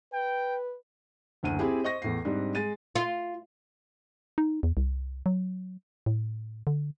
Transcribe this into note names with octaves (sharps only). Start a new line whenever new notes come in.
B4 G5
F#1 D2 D#7
C4 E4 G4 G#4
C5 D#5 C#6 A#6
E2 A2 C7
G#2 G3 C4 D4
G#3 A6 D#7
F4
D#4
E2
C2
F#3
A2
D3